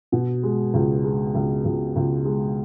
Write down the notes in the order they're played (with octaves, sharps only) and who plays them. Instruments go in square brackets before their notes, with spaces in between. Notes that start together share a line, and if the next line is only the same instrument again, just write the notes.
[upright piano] B2
G#3
C#2
G#3
C#2
C#2
C#2
G#3